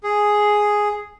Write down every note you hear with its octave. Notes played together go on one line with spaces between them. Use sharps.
G#4